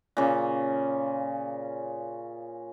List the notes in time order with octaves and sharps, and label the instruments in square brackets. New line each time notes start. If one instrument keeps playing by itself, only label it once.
[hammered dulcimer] A#2 C#3